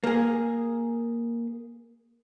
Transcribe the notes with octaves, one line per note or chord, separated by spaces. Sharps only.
A#3 G#4